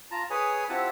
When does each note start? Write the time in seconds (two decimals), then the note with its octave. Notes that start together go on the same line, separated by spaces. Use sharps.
0.11 F4 A5 A#5
0.30 G#4 B4 C#5 G#5 D#6
0.69 C4 E4 F4 G4 F#5 A5